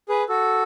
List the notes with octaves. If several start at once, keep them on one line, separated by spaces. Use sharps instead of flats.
G#4 B4
F#4 A4